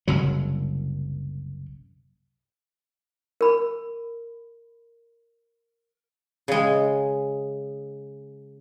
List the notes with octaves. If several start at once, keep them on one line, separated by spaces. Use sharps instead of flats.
F#1 C2 F#3
A#4 B5
C#3 G#3